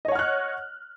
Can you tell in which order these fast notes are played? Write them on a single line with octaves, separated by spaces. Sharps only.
D#5 C#5 F#5 F6 F#6